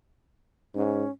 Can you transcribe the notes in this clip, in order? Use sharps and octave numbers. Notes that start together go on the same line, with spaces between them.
G#2 C#4